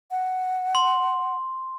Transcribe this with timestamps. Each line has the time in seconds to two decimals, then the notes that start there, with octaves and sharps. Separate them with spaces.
0.11 F#5
0.75 C6